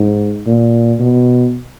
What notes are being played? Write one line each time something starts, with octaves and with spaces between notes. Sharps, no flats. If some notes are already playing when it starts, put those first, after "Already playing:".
Already playing: G#2
A#2
B2